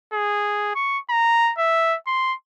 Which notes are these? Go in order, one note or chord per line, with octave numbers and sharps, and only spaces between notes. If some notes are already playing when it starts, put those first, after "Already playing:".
G#4
C#6
A#5
E5
C6